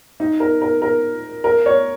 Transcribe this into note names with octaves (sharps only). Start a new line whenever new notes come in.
D#4
A#4
A#4
A#4
A#4
C#5